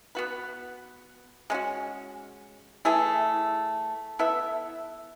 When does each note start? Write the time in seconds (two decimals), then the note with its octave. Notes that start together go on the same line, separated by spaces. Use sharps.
0.15 B3 F#4 B4
1.50 G#3 C#4 F#4
2.85 E3 A3 E4 G#4
4.19 B3 E4 A4 E5